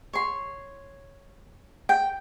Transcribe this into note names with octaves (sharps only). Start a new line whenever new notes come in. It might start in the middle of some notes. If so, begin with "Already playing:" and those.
C#5 C6
G5